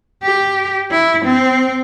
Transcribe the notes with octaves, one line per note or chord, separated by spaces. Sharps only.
G4
E4
C4